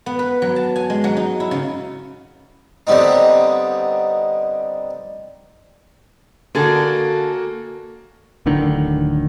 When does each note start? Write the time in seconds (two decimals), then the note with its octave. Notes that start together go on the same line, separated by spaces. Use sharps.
0.06 B3
0.19 B4
0.42 F#3
0.56 A5
0.76 G#5
0.90 G#3
1.04 F#3
1.17 D#4
1.40 E4
1.51 C#3
2.87 D3 G3 B3 C4 D#4
6.55 D3 A#3 F#4 G#4 A4
8.46 D1 A2 D3 D#3